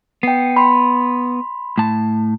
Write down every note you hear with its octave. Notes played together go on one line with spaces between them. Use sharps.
B3 G5 C7
B5 C6
A2 A5